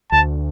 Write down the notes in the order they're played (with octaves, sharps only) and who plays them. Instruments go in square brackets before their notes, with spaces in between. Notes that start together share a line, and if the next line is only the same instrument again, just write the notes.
[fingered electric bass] D2 [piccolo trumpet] A5